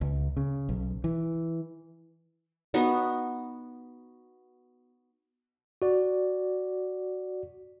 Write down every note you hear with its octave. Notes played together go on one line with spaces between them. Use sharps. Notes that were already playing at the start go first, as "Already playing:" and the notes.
C#2
C#3
B1
E3
B3 D#4 F#4
F#4 D5